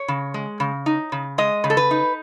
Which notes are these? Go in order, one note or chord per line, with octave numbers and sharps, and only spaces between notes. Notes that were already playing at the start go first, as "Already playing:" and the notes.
Already playing: C#5
C#3
G#3
C#3
D#4
C#3
G#3 D#5
C#3
A4
B4
D#4